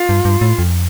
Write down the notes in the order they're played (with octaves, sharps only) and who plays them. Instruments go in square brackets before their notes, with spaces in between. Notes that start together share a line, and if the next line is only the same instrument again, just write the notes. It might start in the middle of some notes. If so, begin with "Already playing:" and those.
Already playing: [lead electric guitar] F4
[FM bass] G2
G2
A2
F2